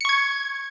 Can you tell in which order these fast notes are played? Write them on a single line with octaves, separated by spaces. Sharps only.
C#7 C#6 G#6